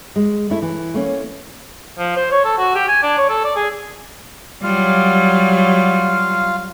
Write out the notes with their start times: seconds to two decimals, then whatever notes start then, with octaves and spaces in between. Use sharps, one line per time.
0.16 G#3
0.50 A3 E4
0.62 E3
0.94 A3 A#3 C#4
1.98 F3
2.16 C5
2.31 C#5
2.45 A4
2.58 F#4
2.75 G4
2.88 G#5
3.02 D4
3.18 C#5
3.29 A4
3.44 D5
3.56 G#4
4.63 F#3 G3 F4 F5